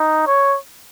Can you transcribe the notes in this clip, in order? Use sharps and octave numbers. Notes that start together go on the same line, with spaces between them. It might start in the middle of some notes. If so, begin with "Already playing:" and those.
Already playing: D#4
C#5